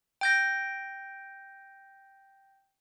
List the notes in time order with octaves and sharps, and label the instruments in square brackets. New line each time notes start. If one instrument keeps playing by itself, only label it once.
[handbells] G5 G6 A#6